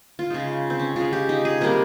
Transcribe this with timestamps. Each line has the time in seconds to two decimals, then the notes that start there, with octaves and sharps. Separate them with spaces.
0.19 F4
0.30 C#3 G#3 D#4
0.70 C4
0.79 C#4
0.96 C#3 G#3 F4
1.13 G4
1.29 D#4
1.45 G#4
1.61 C3 G3 A#3 A#4